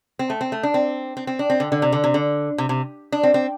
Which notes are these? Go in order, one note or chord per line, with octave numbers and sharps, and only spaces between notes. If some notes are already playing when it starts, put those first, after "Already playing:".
C4
A3
C4
A3
D4
C4
C4
C4
D4
C4
D3
D3
C3
D3
C3
D3
C3
C3
D4
C4
C4